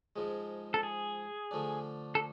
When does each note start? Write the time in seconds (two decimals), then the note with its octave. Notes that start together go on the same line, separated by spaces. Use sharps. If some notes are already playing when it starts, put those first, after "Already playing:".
0.16 G#2 F3 G#3
0.74 A4
0.83 G#4
1.51 D3 F3 A3 D4
2.15 A4